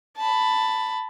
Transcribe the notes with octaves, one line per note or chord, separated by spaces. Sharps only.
A5 B5